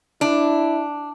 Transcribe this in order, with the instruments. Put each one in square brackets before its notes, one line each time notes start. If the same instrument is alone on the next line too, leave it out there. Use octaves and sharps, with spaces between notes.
[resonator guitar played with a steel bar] D4 [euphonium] E4